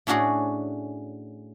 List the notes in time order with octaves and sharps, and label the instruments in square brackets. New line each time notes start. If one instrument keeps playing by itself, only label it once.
[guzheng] A2 C#4 D4 F#4 G#4